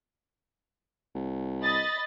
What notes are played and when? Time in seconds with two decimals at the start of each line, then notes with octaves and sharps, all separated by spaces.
1.15 C2
1.62 D#5 B5 A6